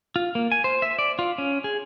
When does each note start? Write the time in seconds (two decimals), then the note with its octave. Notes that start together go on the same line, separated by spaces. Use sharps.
0.16 F4
0.35 A#3
0.52 G#5
0.64 C5
0.82 E5
0.99 D5
1.19 F4
1.38 C#4
1.64 G#4